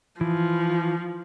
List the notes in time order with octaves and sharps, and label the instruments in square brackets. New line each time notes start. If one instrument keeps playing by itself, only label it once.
[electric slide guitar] E3 [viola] F3